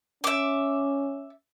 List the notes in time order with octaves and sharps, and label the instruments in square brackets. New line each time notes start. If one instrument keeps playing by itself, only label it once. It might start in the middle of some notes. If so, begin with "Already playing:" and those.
[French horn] C#4 [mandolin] E5 D6